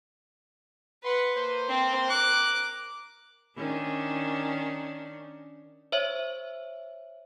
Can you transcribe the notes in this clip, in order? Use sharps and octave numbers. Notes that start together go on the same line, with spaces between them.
B4 F#5 B5 C6
A#3 C5
C4
A#4 D6 F#6
D#3 C#4 D4
C5 C#5 E5